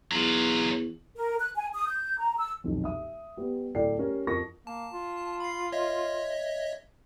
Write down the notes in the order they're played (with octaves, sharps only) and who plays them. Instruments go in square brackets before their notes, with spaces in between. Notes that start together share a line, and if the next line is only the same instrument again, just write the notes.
[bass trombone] E2 [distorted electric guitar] F#3 F4
[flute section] A#4
F#6
G#5
D#6
G6
A#5
E6
[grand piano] D#1 B1 F2
E5 D#6
G3 B3
D1 E4 A4 D5 G5 C7
G3 C#4 A#4
F2 F3 A#4 C#6 D#6 A#6
[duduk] A#3 [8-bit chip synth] A5
[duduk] F4
[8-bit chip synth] B5 C7
C#5 D#5 E5